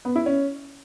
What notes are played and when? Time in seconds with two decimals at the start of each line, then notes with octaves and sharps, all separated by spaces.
0.05 B3
0.16 E4
0.26 C#4